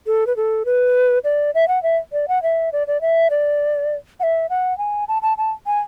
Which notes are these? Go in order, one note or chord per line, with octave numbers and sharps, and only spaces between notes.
A4
B4
A4
B4
D5
E5
F#5
E5
D5
F#5
E5
D5
D5
E5
D5
F#5
E5
F#5
G#5
A5
A5
A5
G#5